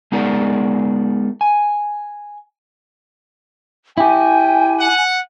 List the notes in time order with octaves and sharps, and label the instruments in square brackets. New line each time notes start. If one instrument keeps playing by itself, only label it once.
[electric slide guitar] G#3 B3 D#4 G#4 A#4 D5
G#5
[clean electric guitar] E4 G4 [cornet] G5 [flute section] G#5
[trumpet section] F#5